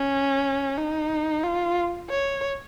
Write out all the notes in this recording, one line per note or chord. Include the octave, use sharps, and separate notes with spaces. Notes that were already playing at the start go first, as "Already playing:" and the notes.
Already playing: C#4
D#4
F4
C#5